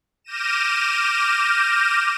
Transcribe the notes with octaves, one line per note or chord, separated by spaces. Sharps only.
D6 F6 G6 A#6 D#7 E7